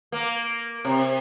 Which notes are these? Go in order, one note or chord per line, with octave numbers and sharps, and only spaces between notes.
A#3
C3